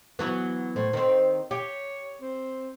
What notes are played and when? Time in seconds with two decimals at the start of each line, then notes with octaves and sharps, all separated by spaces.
0.19 E3 F#3 B3
0.76 A2 C5
0.93 D#3 C4
1.51 G4 C#5
2.21 C4